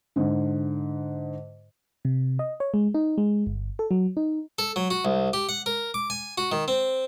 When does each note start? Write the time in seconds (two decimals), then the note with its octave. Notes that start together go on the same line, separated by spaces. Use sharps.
0.16 G#2 D3
2.05 C3
2.39 D#5
2.60 C#5
2.74 G#3
2.94 D#4
3.18 G#3
3.47 G1
3.79 A4
3.91 F#3
4.17 D#4
4.59 A4
4.76 F#3
4.91 F#4
5.05 C2
5.33 G4
5.49 F#5
5.66 A#4
5.94 D6
6.10 G#5
6.38 F#4
6.52 D#3
6.68 C4